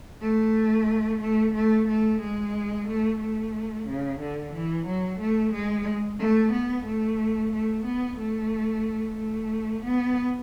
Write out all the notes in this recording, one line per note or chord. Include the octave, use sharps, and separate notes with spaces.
A3
A3
A3
A3
G#3
A3
A3
C#3
D3
E3
F#3
A3
G#3
A3
B3
A3
A3
B3
A3
A3
B3